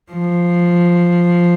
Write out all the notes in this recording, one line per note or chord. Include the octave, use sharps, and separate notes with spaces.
F3